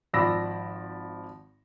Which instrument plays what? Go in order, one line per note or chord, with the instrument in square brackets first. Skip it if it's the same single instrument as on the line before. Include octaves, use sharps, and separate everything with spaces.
[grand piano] G#1 F3 D5 B5 E6 A#6